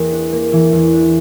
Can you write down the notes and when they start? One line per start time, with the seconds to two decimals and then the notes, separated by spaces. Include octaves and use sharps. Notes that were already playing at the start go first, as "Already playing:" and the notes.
Already playing: E2 A#3 G5
0.12 D4
0.33 A#3
0.53 E3
0.73 E2
0.93 D4